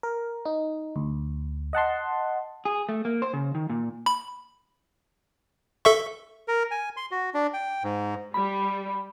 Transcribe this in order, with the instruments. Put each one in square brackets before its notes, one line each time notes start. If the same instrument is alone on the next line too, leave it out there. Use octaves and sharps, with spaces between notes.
[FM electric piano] A#4
D#4
D2
D#5 F#5 A5 C6
[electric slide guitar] G#4
A3
A#3
C5
C#3
D#3
A#2
[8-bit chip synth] B5
A4 E5 C#6
[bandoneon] A#4
G#5
C6
F#4
D4
G5
G#2
[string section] G3 [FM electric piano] B5